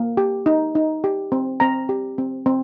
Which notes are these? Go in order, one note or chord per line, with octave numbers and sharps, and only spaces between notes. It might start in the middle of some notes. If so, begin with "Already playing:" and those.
Already playing: A#3
G4
D#4
D#4
G4
C4
C4 A#5
G4
C4
C4